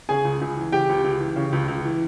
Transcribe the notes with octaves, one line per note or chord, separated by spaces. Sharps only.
C#3 G#4 G#5
C#2
C#2
E3
C#3 G4 G5
C#2
C#2
E3
C#3
C#2
C#2
E3